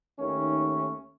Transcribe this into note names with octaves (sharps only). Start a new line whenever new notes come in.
D#2 D#3 A3 C#4